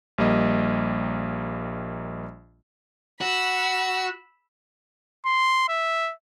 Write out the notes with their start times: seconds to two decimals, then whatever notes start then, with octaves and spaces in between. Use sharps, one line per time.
0.18 A#1 G3 A#3 D#5
3.21 F#4 B5 E6
5.26 C6
5.69 E5